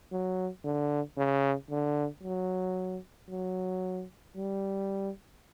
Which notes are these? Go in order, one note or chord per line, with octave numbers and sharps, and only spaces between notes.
F#3
D3
C#3
D3
F#3
F#3
G3